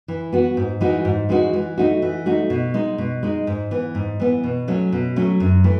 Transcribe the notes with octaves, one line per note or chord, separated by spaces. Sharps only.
E3
B3 F#4
G#2
E3 G#3 D#4 F#4
G#2
E3 G#3 D#4 F#4
E3
A3 D#4 F#4
E3
A3 D#4 F#4
B2
G#3 D#4
B2
G#3 D#4
G#2
E3 B3
G#2
E3 B3
B2
F#3 A3 C#4
B2
F#3 A3 C#4
F#2
E3 A3